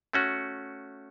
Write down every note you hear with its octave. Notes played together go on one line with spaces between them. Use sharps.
A3 C#4 F#4